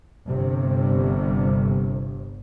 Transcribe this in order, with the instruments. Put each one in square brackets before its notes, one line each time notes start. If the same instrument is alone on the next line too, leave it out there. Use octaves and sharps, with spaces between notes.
[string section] G1 [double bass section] C3